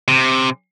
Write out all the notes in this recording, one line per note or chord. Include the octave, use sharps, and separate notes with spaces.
C3